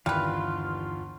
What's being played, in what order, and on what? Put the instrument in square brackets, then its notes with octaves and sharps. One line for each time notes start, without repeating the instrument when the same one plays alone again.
[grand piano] G1 [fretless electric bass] D#2 D#3 E3 [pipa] G3 B4 [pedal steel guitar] F4